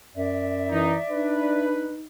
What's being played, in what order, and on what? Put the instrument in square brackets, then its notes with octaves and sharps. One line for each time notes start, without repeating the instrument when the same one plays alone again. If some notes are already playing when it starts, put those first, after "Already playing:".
[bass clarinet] F#2 [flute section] D5 E5
[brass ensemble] E3 D#4
[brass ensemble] D4 B4 [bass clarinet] D#4